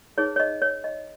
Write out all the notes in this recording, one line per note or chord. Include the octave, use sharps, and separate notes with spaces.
D#4 G#4 B4 C#5
C#5
D#5
C#5
D#5